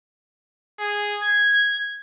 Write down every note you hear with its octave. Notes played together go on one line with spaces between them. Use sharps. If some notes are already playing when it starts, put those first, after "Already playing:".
G#4
G#6